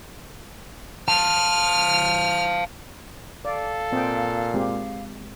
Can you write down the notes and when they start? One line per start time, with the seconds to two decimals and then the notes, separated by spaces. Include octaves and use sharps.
1.08 F5 A5 F6
3.45 A4 D5 F5
3.92 A#2 C4 D#5 G5
4.54 G#3 C4 G4